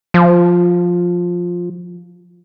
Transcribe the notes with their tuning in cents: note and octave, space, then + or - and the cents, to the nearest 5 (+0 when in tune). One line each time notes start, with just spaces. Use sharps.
F3 +10